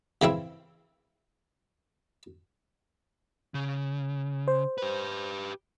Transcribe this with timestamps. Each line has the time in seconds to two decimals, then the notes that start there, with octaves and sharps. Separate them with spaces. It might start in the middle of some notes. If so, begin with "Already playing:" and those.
0.22 C#3 E3 C4 E4
3.54 C#3
4.48 C5
4.78 G4 B4